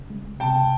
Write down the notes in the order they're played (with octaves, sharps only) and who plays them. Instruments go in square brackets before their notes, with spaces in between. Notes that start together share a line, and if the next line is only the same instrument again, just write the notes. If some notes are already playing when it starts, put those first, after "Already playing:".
Already playing: [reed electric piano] C#3
G#3
[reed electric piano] C3 [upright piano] G5 A5